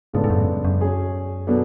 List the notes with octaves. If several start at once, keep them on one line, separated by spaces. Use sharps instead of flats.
G#2 C#3 G#3 B3 D4 A4
G#2
F#2
F#2
F#3 C#4 G#4
B2 F#3 B3 D4 A4